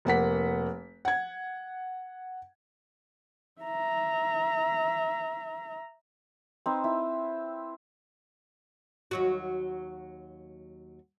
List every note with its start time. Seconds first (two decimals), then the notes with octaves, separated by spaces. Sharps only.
0.05 F1 A#3 F#5 B6
1.05 F#5 G#6
3.62 E5 A#5
6.66 C4 D#4 B4
6.84 E4
9.11 D#2 F#3 F#4